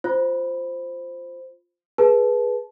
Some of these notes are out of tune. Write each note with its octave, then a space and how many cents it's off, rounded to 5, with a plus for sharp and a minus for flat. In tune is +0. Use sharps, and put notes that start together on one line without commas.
F4 +0 C5 +0 B5 +0
G#4 +0 B4 -20 A5 -25